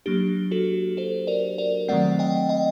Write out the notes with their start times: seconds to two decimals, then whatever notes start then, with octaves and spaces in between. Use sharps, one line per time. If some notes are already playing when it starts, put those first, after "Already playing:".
0.06 F#3 A#3 D4 G4
0.51 F#4 A4
0.97 A4 C5
1.27 A#4 D5
1.58 A#4 D5
1.88 D#3 F#3 A3 C4 D5 F#5
2.19 D#5 G5
2.49 D#5 G5